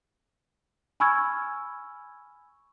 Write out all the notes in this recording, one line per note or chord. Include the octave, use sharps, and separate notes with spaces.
G#5 B5 C#6 E6 F6 G#6